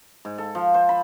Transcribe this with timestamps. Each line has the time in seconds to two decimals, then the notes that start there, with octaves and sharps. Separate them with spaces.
0.25 G#2
0.38 A4
0.55 F3
0.74 C5
0.89 B5